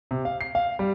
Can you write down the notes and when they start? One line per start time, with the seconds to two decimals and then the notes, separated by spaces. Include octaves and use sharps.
0.11 C3
0.25 F5
0.41 C7
0.55 F5
0.79 G3